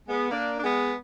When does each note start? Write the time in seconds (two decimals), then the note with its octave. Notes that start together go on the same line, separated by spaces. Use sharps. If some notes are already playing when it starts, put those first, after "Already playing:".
0.09 G#3 B3
0.31 A#3 D4
0.58 D4
0.64 G#3 B3